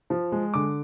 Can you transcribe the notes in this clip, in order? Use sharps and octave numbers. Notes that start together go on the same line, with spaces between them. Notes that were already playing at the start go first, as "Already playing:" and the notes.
F3
G#3
D3 D6